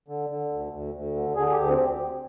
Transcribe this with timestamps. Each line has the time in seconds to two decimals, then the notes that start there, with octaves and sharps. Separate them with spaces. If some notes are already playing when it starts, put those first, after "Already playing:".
0.08 D3
0.30 D3
0.52 D2
0.73 D2
0.94 D2
1.15 D3
1.36 D3 G#4
1.47 G#4
1.52 G4
1.57 D2
1.69 C4